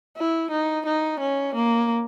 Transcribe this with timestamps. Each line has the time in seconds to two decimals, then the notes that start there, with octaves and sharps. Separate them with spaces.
0.17 E4
0.51 D#4
0.86 D#4
1.20 C#4
1.55 A#3